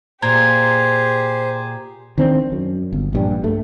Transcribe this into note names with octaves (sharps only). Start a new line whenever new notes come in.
A#2 G4 G#4 C5 A#5 G#6
D#3 C4 D4
F#2
G1
A#1 G2 G3
G2 A3